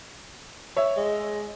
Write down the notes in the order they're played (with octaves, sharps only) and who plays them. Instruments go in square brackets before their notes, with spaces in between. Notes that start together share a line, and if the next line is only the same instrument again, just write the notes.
[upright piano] C#5 E5
[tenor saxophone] G#3